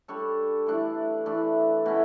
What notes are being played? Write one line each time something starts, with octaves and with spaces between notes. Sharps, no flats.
G3 D4 A4 C#5
E3 A3 D4
E3 A3 D4
B2 A3 C#4 E4